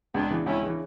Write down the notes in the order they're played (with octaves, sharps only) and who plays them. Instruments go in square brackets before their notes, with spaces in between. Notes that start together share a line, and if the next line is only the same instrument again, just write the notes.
[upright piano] C#2 [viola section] B3 D4
[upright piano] C#3 E3
[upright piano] C#2 [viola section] C#4 E4
[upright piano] C#3 E3